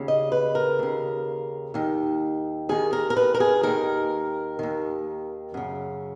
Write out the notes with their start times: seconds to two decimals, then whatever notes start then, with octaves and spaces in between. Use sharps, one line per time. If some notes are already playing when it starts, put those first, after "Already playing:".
Already playing: D#2 C#3
0.08 D#5
0.32 B4
0.55 A#4
0.79 D#2 C#3
1.74 D#2 D#3
2.69 D#2 D#3 G#4
2.93 A#4
3.10 A#4
3.17 B4
3.34 A#4
3.40 G#4
3.63 D#2 D#3 A#4
4.59 D#2 D#3
5.54 F#2 C#3